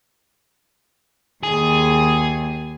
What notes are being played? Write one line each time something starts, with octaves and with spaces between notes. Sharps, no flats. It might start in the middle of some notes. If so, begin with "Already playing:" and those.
D#2 G#4